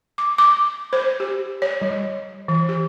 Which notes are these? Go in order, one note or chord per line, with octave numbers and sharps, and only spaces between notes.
D6
D6
C5
G4
C#5
G3
E3
G4